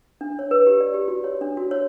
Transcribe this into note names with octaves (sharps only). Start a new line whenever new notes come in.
D4
C#5
B4
G4
D5
G4
F#4
C#5
D4
F#4
C#5